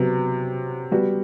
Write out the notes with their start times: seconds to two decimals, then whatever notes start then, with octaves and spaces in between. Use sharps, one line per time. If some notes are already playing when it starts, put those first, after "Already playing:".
Already playing: C3 F#3 B3 F#4
0.92 G3 B3 F#4